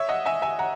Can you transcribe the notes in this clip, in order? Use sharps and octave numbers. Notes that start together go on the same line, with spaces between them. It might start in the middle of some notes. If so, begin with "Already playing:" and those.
Already playing: C#5 E5
D#5 F#5
E5 G#5
E5 G#5
F#5 A#5